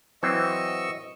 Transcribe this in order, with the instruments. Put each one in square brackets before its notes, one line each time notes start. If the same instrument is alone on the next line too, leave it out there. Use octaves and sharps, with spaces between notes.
[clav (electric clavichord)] E3 F#3 C4 [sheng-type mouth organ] D#5 C#6 E6